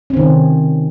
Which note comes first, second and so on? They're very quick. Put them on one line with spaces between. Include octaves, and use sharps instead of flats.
C#4 C4 D#3 C3